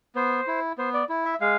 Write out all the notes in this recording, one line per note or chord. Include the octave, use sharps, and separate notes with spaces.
B3 C5
E4
B3 C5
D5
E4
E5
G#3 F5